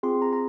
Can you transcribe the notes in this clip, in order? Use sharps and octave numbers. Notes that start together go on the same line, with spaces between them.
C4 F4 G#4 C6
A#5
A#5